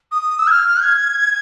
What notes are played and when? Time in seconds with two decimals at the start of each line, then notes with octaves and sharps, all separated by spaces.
0.12 D#6
0.39 E6
0.47 G#6
0.51 F6
0.82 G#6